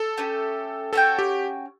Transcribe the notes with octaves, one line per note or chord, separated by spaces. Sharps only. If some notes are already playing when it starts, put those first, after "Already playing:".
Already playing: A4
A3 C#4 G4
C#4 F#4 A4 C#5 G5
G4